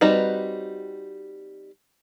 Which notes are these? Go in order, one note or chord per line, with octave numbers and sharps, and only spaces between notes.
G3 C4 D#4 F#4 B4